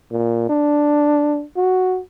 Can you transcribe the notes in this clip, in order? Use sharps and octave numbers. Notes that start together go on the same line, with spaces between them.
A#2
D4
F#4